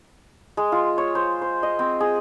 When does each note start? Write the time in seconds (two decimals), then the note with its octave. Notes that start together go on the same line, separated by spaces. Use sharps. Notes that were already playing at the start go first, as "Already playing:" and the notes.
0.57 G#3
0.72 F4
0.98 C#5
1.15 C5
1.42 C5
1.63 D#5
1.79 C4
2.00 G#4